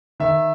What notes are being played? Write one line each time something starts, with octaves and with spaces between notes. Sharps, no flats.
D#3 E5